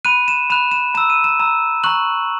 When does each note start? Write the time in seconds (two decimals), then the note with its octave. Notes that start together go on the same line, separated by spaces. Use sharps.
0.05 B5 F#6 D#7
0.28 E7
0.50 B5 F#6 E7
0.72 E7
0.95 A#5 E6 E7
1.10 D#7
1.24 E7
1.40 A#5 E6
1.84 A#5 C#6 F#6 F#7